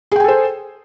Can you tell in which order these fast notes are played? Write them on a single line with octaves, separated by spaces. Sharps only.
G#4 G5 G#5 A4 C5